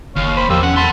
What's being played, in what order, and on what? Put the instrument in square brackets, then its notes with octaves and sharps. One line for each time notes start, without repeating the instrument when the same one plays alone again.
[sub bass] F#1 [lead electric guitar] D#2 [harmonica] C#5 F5
[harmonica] C5 B5
[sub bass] E2 [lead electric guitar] F3 [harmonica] A#3 G4 E6
[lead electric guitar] C#4 [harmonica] F#5
[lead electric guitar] F#5 C6 [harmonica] A5 B5